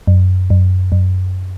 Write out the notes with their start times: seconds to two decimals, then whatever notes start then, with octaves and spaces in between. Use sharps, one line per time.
0.07 F#2
0.50 F#2
0.92 F#2